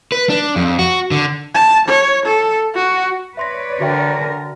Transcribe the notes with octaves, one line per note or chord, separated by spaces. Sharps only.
B4
D4
F2
F#4
D3
A5
C#5
A4
F#4
B4 C#5 D5 E5 C6 A#6
D3 F#4 A#4 E5 G5